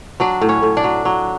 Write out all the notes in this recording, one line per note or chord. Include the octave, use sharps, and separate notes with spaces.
F#3 D4 D5
A2
C#4 C#5
A2
D4 D5
F#3
F#3